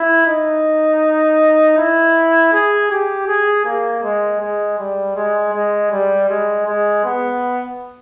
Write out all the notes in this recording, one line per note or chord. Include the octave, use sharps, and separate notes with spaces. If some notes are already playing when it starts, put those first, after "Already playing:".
Already playing: E4
D#4
E4
G#4
G4
G#4
A#3
G#3
G#3
G3
G#3
G#3
G3
G#3
G#3
B3